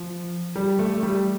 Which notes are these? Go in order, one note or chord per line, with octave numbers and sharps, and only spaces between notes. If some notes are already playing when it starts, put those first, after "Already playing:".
Already playing: F3
G3
A3
A3
G3